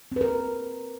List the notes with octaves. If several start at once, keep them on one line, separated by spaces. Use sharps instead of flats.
C4 A#4 B4